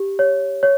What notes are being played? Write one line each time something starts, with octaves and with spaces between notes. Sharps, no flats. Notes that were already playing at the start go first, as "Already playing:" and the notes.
Already playing: G4
C#5
C#5